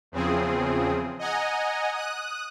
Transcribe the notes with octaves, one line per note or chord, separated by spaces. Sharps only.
E2 C#3 F3 C4 G#4
D#5 F#5 G#5 A#5
D#6 F#6